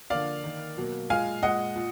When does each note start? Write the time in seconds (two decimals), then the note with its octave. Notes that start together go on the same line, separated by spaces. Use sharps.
0.10 D3 F3 A#3 D5 F5
0.44 D#3 A#3
0.77 B2 F#3 A#3
1.10 A#2 G#3 F5 G#5
1.43 A#2 G#3 D#5 F#5
1.76 A#2